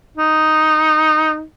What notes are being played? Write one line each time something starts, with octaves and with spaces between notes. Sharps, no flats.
D#4